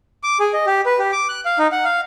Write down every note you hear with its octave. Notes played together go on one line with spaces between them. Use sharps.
D6
G#4
D#5
G4
B4
G4
D6
F#6
F5
D#4
F#5
F5